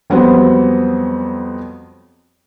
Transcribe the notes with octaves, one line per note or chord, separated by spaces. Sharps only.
F2 F#3 G3 B3 C4